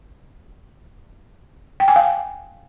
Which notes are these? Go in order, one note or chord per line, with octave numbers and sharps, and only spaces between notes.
G5
G#5
F5